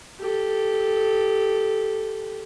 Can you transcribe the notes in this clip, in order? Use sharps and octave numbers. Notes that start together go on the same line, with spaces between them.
G4 A4